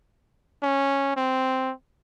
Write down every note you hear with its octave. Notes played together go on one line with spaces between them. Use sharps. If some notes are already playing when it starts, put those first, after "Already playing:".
C#4
C4